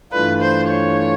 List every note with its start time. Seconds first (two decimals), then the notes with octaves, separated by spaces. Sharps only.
0.12 G2 E3 A3 D4 F4 B4
0.41 C5
0.68 C#5